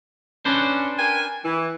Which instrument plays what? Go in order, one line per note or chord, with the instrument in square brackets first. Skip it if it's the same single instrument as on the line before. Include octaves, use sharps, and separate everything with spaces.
[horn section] C#4 [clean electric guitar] D4 B4 C5
[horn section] A#4 G5 G#5
E3